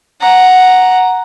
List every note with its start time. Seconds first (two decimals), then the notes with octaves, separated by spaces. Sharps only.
0.21 F#5 A#5